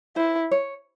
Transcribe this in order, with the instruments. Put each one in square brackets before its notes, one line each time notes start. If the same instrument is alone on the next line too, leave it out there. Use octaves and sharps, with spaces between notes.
[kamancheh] E4 [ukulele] C5
[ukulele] C#5